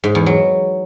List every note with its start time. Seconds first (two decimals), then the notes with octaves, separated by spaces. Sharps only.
0.04 G#2
0.15 E2
0.26 F#3